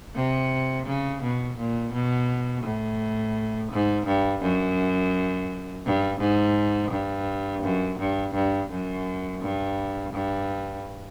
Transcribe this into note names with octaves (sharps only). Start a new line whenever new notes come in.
C3
C#3
B2
A#2
B2
A2
G#2
G2
F#2
G2
G#2
G2
F#2
G2
G2
F#2
G2
G2